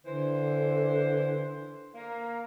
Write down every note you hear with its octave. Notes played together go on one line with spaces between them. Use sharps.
D3 E3 C5
A#3